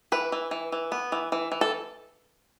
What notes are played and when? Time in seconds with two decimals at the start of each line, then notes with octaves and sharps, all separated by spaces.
0.12 E3 B4
0.32 E3
0.51 E3
0.72 E3
0.92 B3
1.12 E3
1.32 E3
1.52 E3
1.61 A4